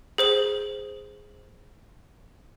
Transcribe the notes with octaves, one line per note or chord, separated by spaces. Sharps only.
G#4 C5 F#7